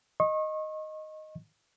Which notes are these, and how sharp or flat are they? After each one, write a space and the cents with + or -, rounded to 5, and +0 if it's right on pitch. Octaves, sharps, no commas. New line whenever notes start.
D#5 +0 C#6 -35